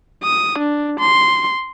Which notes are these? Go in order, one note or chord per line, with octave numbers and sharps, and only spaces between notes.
D#6
D4
C6